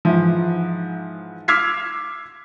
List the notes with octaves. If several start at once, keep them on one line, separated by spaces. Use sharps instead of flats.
G#2 E3 F3
D6 E6 F6 G#6 B6 C7